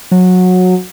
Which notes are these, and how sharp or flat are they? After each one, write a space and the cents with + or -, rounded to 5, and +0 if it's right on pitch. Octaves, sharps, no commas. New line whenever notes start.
F#3 -20